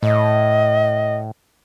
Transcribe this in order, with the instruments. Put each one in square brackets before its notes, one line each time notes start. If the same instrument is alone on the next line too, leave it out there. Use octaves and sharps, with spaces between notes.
[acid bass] A2 [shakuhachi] D#5